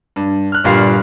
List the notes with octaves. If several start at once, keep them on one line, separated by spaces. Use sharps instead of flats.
G2
F6 F#6
G1 A#2 G3 F5 F6 C7